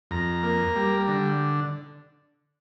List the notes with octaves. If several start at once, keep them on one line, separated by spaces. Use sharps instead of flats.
F2 A#5
A#3
G3
D3